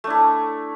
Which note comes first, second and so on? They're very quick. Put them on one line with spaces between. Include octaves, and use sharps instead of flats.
A3 D4 E4